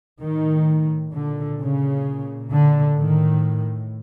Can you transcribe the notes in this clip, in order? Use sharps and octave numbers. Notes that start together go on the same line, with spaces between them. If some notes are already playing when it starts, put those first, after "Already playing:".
A2 D#3
A#2 D3
C#3
A#2
D3
A2 D#3